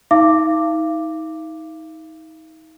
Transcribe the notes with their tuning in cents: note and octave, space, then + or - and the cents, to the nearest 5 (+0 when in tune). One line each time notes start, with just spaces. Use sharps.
D#4 +35 F5 -35 D6 +0